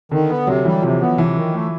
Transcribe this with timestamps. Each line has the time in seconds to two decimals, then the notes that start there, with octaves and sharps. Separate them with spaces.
0.11 D3 D#3
0.29 B3
0.47 C3 F#3
0.65 E3 G3
0.82 C3 F3
1.00 B3
1.18 C3 E3
1.36 D#3
1.54 A3